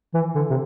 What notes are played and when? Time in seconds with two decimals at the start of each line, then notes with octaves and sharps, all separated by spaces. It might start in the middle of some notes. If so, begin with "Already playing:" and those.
0.14 E3
0.35 D3
0.50 C3